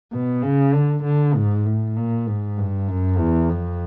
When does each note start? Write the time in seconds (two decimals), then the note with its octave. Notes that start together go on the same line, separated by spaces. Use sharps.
0.12 B2
0.43 C#3
0.73 D3
1.03 D3
1.35 G#2
1.65 A2
1.96 A#2
2.26 G#2
2.57 G2
2.87 F#2
3.18 E2
3.49 F2